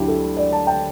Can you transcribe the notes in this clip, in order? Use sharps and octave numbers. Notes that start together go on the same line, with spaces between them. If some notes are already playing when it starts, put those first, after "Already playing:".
Already playing: D2 D3 F#3 E4 G4
A4
D5
A5
G5